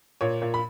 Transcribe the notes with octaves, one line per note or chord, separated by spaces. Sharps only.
A#2 C#5
A#2
B5